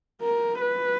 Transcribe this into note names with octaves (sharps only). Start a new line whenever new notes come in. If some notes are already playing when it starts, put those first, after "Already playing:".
A#4
B4